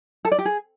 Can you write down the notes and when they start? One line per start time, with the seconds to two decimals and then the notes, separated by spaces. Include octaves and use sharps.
0.25 A4
0.32 D5
0.38 G4
0.45 G#4